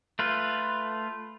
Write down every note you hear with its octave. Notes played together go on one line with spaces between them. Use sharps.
A3 F4 B4